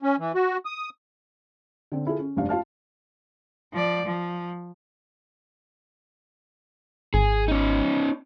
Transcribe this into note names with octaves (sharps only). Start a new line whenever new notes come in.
C#4
E3
F#4
D#6
D3 C4
E4 F4 G#4 A4
C#4
F1 G2 D4 F5
F4 F5 A5 F6
F3 D5
F3
G#1 G#4
C#4 D#4